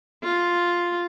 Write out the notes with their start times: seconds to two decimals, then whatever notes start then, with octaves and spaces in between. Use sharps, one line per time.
0.23 F4